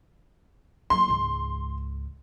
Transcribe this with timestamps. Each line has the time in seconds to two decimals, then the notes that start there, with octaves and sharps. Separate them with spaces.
0.90 F#3 A#3 C6
1.08 C#2 G#2